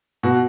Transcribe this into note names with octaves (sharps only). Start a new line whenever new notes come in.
B2 F#4